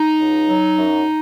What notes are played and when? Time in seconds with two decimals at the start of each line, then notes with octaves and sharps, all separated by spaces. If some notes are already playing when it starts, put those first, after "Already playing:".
Already playing: D#4
0.19 C#2
0.48 F#3
0.78 F#2